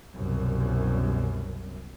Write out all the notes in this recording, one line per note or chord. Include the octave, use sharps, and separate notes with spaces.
C2 F#2 B2